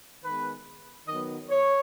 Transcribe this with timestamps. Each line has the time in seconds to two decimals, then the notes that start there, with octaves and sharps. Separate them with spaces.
0.23 D#3 G#3 B3 B4
1.08 D#3 F#3 B3 D#5
1.50 C#5